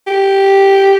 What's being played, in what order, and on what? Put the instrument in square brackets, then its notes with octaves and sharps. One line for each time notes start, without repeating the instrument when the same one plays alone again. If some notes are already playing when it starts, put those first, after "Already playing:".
[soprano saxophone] G4